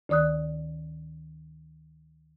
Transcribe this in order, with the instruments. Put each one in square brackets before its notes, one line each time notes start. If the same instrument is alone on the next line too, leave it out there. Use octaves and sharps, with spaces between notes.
[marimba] D2 D#3 D5 D#6 F#6